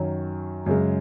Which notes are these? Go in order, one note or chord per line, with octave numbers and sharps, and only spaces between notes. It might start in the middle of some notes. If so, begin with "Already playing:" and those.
Already playing: F#2 D#3 F#3
F#2 C#3 G#3